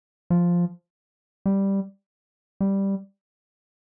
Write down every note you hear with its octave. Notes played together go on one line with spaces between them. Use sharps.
F3
G3
G3